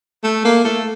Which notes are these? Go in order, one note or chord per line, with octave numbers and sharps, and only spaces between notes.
A3
A#3
A3